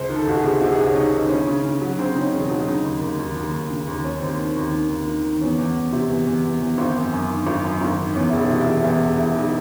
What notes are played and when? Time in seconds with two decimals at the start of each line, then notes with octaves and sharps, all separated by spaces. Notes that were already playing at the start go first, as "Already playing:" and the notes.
Already playing: C#2 C5
0.10 D#3
0.16 A4
0.27 C#2 F#4
0.39 G#4
0.44 C3
0.61 C3 F#4
0.72 G#4
0.78 C#2 F#4
0.89 C#4
0.96 C3 D#4
1.12 D#3
1.26 C4
1.30 C#3 C#4
1.47 C#3
1.65 C#3
1.81 F#3
1.99 C#3 C4
2.12 C#3 D#4
2.21 C#4
2.33 E1
2.45 D#4
2.51 F#3
2.67 C#3 D#4
2.85 D#2
3.01 D#2
3.19 D#2
3.36 D#2
3.53 D#2
3.70 C#3
3.87 D#2
4.04 D#2 C#4
4.18 D#2 C4
4.38 D#3
4.46 C4
4.56 D#2
4.72 D#3
4.90 D#2
5.07 D#3
5.24 D#3
5.41 E2 C#4
5.58 E2
5.76 E2
5.93 C3
6.09 E2
6.27 E2
6.45 E2
6.61 E2
6.78 G#1 C4
6.96 F#2
7.12 F#2
7.30 D#3
7.47 G#1
7.63 F#2
7.81 G#1
7.98 D#3
8.15 E2 C#4
8.30 E1 E4
8.39 D#4
8.50 C3
8.61 E4
8.67 E1
8.84 E2 E4
9.00 E1
9.18 E1 E4
9.35 E1 D#4
9.44 E4